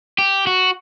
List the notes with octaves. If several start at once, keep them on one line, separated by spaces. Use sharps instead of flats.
G4
F#4